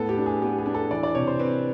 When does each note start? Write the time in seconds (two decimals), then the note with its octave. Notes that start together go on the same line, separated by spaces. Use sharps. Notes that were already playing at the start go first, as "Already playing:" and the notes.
Already playing: A2 B3 A4
0.09 G4
0.17 D4
0.26 G#4
0.42 B3 G4
0.58 G#4
0.66 D4
0.75 A4
0.91 E3 D5
1.03 D5
1.15 C3 C#5
1.27 C5
1.39 C4 B4